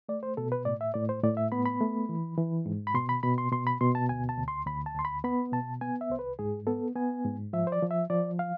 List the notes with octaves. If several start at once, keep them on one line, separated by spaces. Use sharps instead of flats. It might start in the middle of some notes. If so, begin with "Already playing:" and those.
A3 D5
C5
B2 A4
B4
A2 D5
E5
A2 D5
C5
A2 D5
E5
B3 B5
B5
A3
E3
E3
G#2
B5
B2 C6
B5
B2 B5
C6
B2 C6
B5
B2 C6
A5
D2 G#5
A5
D2
C6
D2 B5
A5
D2 C6
B5
B3 B5
B2 A5
B3 G#5
E5
C2 C5
B4
G#2 G#4
B3 A4
B3 G#5
G#2
F3 E5
C5
D5
F3
E5
F3 D5
F5